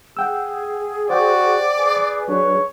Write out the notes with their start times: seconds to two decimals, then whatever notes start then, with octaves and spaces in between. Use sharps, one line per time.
0.17 G#4 F#5 G5 E6
1.10 F#4 C5 D5 F#5 G5
1.78 G#4 B4
2.28 F#3 D4 G#4 C#5